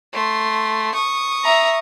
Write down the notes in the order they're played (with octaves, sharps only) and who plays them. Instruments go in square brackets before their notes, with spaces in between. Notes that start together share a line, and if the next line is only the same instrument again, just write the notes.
[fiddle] A3 C6
C#6 D#6
[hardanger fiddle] E5 A#5